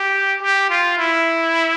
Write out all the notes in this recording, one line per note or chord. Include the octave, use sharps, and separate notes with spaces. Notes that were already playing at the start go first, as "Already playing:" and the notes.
Already playing: G4
G4
F4
E4